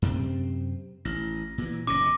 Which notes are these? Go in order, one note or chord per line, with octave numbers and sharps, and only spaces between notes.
F#2 C3 C4
A1 A#6
A#2 E3
F#1 B2 C#4 D6 A#6